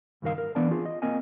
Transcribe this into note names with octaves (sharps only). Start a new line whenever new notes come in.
C#2 G2 D#3 A#4 F5
A#4
E3 B3 D4 D5 F5 A5
F4 G#4
D#5
A#3 C4 A#4 D#5 G#5